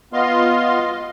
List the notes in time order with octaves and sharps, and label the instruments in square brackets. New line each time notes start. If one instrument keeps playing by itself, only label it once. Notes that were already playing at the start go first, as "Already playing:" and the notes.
[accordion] B3 F4 D#5 F5 C6